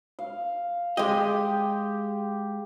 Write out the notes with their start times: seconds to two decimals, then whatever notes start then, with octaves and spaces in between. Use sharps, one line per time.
0.19 F5
0.97 G#3 G4 D#5